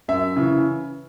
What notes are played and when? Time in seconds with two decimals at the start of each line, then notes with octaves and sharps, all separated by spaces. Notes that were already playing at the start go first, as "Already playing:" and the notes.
0.08 F#2 E5
0.36 C#3 E3